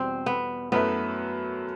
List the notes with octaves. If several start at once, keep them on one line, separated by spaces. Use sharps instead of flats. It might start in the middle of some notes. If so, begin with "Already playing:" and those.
Already playing: E2 B2 G3 C4
B3
F#2 F#3 A3 B3 E4 B4